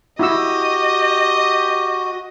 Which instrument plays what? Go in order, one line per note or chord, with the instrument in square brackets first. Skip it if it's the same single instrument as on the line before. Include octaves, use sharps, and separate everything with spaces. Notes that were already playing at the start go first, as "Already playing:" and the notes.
[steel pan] E4 E6 [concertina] F#4 [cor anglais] G4 [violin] D#5